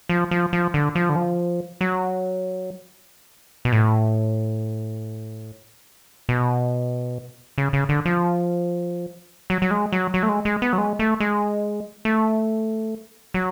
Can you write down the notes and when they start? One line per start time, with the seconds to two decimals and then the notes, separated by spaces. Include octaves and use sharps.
0.09 F3
0.31 F3
0.53 F3
0.74 D3
0.95 F3
1.09 D3
1.16 F3
1.81 F#3
3.65 B2
3.72 A2
6.29 B2
7.58 C#3
7.73 C#3
7.89 D3
8.05 F3
9.50 F#3
9.62 F#3
9.71 G#3
9.93 F#3
10.14 F#3
10.23 A3
10.29 G#3
10.45 G#3
10.62 B3
10.73 F#3
10.78 G#3
10.99 A3
11.20 G#3
12.05 A3
13.34 F#3